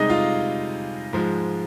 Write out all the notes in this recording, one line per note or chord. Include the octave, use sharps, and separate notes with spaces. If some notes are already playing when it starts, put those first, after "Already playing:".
Already playing: C3 G3 G#3 D#4 G#4 D#5
F4 F5
G#2 F3 G#3